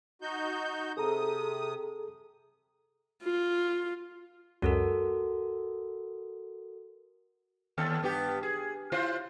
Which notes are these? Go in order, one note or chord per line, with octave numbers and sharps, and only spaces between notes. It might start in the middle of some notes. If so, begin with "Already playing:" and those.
D#4 F#4 G6
C3 G#4 A4 A#5 D#6
F4
C#2 F#2 F#4 A4 A#4
D#2 A4
G2 B3 G4
G#4
E4 F4 C5